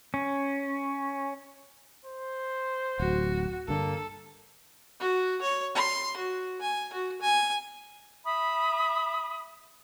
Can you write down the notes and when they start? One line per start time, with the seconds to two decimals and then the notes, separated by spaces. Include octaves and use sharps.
0.14 C#4
2.05 C5
3.00 D1 F#4
3.68 G2 D3 A#3 A4
5.00 F#4
5.42 C#5
5.75 C6
6.17 F#4
6.61 G#5
6.93 F#4
7.22 G#5
8.24 E5 B5 D#6